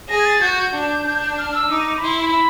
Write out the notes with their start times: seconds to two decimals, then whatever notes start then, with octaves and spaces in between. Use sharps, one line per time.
0.09 G#4 A#6
0.19 G#6
0.25 A6
0.41 F#4 G6
0.58 G6
0.74 D4
1.07 D4
1.38 F6
1.55 E6
1.70 D#4 D6
1.98 B5
2.03 E4 C6
2.20 B5